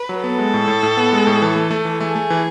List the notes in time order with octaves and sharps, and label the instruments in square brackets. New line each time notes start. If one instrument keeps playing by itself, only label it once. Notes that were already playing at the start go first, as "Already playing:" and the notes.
Already playing: [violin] B4
[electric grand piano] F#3
[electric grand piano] B3 [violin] A4
[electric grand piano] G#3
A2
A2
A2
B3
G#3
A2
E3
A3
A3
E3
[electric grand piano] A3 [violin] G#4
[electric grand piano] A3
E3